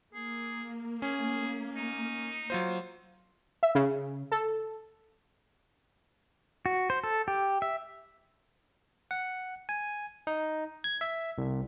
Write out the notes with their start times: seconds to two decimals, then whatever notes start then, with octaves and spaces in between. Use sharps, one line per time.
0.14 A#3 G#4
1.02 C#4 G#4
1.76 D#4
2.50 F#3 F4 C5
3.63 E5
3.75 C#3
4.32 A4
6.66 F#4
6.90 C5
7.04 A4
7.28 G4
7.62 E5
9.11 F#5
9.69 G#5
10.27 D#4
10.84 G#6
11.01 E5
11.38 C2